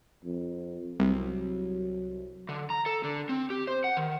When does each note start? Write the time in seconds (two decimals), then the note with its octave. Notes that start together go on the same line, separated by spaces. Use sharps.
0.25 F2
1.00 C2 F#3
2.49 D3
2.70 A#5
2.86 A4
3.04 D3
3.29 C4
3.50 G4
3.67 C5
3.84 F#5
3.97 D#3